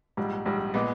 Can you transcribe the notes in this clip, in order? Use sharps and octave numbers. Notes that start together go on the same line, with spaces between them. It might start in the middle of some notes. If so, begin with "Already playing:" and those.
A#1 G#2 G3
A#1 G#2 G3
A#2 G#3 B3